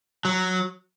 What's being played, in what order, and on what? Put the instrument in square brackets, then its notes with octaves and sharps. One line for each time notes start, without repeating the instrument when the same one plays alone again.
[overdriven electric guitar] F#3